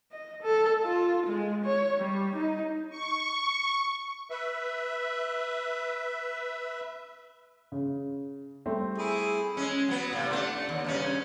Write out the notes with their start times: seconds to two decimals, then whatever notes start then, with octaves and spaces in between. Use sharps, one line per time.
0.12 D#5
0.43 A4
0.85 F4
1.27 G#3
1.65 C#5
2.00 G3
2.35 D#4
2.90 C#6
4.30 B4 E5
7.72 C#3
8.65 G3 A3 C4
8.98 E4 G#4
9.57 G#3 C#4
9.88 F#3 B3
10.13 A2 C3
10.31 A3 A#3 D4
10.69 D#2
10.84 G2 C#3 C#4